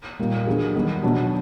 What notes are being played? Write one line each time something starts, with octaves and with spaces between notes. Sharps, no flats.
A#2 G3 A#3 D#4
D3 F#3 B3 D#4 G#4
D#3 G3 B3
B2 F#3 B3 D4